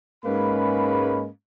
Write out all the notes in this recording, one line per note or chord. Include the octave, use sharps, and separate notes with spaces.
G#2 G#3 A#3 C#4 B4 B5